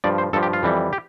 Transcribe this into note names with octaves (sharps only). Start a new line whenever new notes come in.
G2 F3 D5
C5
G2 F3 A4
G4
F4
F2 E3 G3
G4